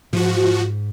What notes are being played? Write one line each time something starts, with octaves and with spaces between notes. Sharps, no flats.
G#2 F3 F#4